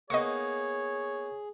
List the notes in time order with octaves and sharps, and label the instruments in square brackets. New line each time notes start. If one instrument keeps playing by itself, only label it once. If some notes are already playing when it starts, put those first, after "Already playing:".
[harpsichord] A#3 B3 D#4 [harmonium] G#4 [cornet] C#5 [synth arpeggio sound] D#5 C#6